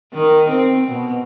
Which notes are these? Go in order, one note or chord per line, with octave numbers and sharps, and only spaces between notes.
D#3
C4
B2